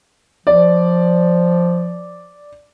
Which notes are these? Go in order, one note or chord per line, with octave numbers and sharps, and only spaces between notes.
F3 D5